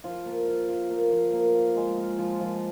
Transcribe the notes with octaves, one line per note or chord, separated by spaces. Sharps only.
F3 F4
A#3
F4
F4
A#3
F3
A#3
F4
G#3
F4
F3
F3